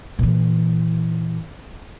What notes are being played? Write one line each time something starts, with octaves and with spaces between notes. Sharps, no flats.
A#2 E3